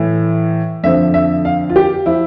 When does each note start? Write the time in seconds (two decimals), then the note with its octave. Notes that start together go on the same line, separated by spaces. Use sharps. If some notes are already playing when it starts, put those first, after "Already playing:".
Already playing: A2 E3
0.83 F2 D3 F3 E5
1.14 E5
1.45 F5
1.70 F4
1.76 G4
2.06 F3 E4